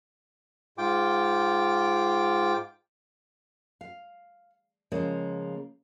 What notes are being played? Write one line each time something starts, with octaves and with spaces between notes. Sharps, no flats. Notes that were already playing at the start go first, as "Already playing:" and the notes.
G#2 F4 G5 D6
F5
C#3 F3 G#3 A#3